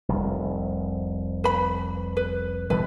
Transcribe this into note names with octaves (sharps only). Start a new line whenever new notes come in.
F1 C2
B4 B5
B4
B2 E3 G3 B4